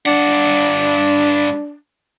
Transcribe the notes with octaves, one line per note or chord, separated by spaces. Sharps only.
G2 D4 F#5